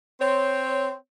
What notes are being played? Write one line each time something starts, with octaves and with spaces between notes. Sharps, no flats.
C4 C#5